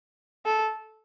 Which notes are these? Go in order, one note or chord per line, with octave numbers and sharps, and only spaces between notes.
A4